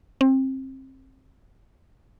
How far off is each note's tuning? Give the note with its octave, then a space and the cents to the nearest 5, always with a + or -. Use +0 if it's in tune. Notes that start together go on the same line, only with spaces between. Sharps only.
C4 +25